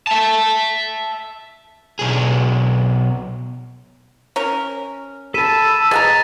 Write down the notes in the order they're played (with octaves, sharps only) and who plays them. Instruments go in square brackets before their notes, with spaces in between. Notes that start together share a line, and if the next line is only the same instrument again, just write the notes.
[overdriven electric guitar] E5 A5
B1 G#4
[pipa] C#4 A#4
[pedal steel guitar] A4 A5 [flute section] B5 E6 [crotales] B6 D#7 E7
[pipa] G#4 F#5 A#5 [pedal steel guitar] B4 D#5 [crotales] A6